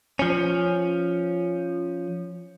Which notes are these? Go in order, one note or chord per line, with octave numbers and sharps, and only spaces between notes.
F3 C#4